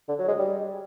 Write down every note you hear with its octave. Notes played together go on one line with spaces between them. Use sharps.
D3
F#3
G#3
G3